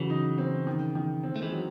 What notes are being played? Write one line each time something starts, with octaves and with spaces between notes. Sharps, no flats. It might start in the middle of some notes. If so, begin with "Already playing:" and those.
Already playing: C#3 E3 F#3 F#4
D#4
C4
D#3
D#3
C4
A3
E3 G#3
F#3